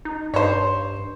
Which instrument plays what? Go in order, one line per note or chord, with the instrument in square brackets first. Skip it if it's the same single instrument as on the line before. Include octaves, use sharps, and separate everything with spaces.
[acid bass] D#4
[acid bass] G2 [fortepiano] C5 C#5